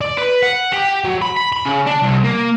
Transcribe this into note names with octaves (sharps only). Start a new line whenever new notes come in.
D5
B4
F#5
G4
F#3
B5
B5
B5
C#3
D4
C2
A#3